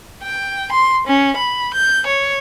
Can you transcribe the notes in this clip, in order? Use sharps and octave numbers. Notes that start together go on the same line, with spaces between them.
G5
C6
C#4
B5
G6
C#5